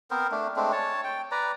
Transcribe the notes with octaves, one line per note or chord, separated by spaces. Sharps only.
B3 C4 A#4 C5
A3 D4
G#3 A3 C4 D4
C#5 A5
G5
B4 D5 A#5